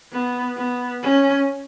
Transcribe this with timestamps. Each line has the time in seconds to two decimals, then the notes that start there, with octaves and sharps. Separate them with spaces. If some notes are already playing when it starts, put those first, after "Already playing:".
0.12 B3
0.57 B3
1.02 C#4